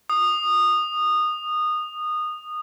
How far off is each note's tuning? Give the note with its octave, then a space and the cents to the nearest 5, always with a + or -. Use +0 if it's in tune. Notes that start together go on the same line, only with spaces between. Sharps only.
D#6 -20